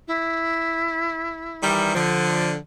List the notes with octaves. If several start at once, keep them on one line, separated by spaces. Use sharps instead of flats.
E4
D#3 E3 G3
D3 F3